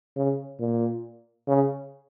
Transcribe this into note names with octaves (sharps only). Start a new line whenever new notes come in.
C#3
A#2
C#3